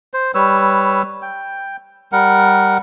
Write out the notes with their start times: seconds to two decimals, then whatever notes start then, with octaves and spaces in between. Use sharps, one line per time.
0.14 C5
0.34 G3 B4 C#5 E6
1.22 G5
2.12 G3 A#4 F#5